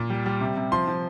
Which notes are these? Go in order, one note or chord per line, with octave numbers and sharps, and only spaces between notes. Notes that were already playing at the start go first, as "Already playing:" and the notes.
Already playing: A#2
G3
G3
C3
C3
F3 C6
F3